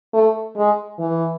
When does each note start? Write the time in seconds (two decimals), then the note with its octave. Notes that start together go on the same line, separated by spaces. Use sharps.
0.14 A3
0.57 G#3
0.99 E3